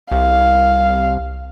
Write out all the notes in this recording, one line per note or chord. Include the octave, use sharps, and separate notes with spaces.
C2 F5